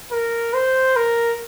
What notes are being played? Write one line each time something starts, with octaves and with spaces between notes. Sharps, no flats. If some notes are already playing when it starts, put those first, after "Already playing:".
A#4
C5
A#4